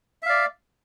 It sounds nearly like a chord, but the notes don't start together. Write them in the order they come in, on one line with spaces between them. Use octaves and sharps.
E5 F5 D5